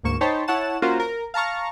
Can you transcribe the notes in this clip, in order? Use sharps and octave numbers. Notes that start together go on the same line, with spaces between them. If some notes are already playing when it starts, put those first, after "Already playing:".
D2 G#2 A#3 C#6 E7
D#4 C5 C#5 G5 A5 B5
E4 C#5 F#5 A5 E7
A#3 C#4 F4 F#4 A#4 C5
A#4
F5 A5 A#5 C#6 F6